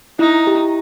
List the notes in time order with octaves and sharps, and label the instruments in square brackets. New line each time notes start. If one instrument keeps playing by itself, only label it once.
[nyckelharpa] D#4 [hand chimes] E4
[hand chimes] G4